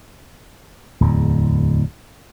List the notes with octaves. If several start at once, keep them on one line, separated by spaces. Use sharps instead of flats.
D1 E2